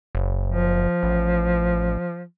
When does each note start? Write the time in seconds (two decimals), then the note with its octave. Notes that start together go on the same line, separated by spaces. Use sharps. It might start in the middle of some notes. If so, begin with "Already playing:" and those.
0.15 F#1
0.47 F3
1.03 A1